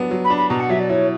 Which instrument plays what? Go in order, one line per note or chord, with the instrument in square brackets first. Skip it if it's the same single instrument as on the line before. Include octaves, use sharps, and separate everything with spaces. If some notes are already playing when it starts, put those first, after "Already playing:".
Already playing: [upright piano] F#3 B3 D4
F#3
[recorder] B5
[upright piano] D4
[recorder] B5
[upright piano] B2 [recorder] A#5
[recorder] F#5
[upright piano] F#3 [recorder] E5
[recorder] D5
[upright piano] E4 [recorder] C#5